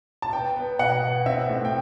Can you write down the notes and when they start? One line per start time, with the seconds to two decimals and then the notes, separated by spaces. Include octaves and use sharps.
0.22 A5
0.33 B3 G5
0.56 B3
0.79 B2 F#5
1.03 B3
1.26 C4 E5
1.50 A2
1.65 G5